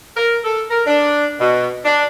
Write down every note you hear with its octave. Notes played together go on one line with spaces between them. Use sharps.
A#4
A4
A#4
D4
B2
D4